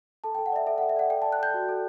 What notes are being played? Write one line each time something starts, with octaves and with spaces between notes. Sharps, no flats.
A4 A5
A4 G5
F#5
D5 E5
A4 E5
A4 F#5
E5
D5 F#5
A4 G5
D5 A5
F#6
A4 G6
F#4
A4